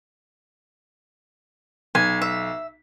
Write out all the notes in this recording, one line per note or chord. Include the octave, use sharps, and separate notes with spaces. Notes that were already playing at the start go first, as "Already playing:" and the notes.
B1 G#5
E5